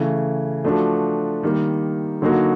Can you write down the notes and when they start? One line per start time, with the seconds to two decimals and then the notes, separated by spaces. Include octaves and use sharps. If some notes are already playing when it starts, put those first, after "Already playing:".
Already playing: C#3 E3 A3
0.64 F3 A3 D4 F#4
1.43 D#3 G3 A#3
2.22 D3 F#3 A#3 D#4 F#4